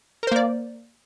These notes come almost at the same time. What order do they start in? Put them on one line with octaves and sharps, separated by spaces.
A#4 C5 A#3 D5